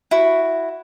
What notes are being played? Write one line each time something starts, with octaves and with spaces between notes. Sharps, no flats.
E4 F#4